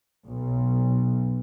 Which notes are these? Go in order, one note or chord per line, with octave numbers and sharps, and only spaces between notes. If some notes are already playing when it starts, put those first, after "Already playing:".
B1